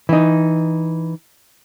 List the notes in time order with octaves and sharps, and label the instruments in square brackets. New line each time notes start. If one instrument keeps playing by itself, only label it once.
[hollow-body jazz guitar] E3 D#4